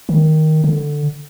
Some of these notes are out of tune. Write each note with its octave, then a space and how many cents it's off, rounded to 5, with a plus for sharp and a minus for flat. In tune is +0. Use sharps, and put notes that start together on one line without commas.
D#3 +5
D3 +5